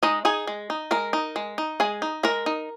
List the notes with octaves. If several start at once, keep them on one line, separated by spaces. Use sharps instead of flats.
G#3 D#4 D#5
D#4 G#4 G#5
G#3
D#4
G#3 A#4 A#5
D#4
G#3
D#4
G#3 G#4 G#5
D#4
G#3 A#4 A#5
D#4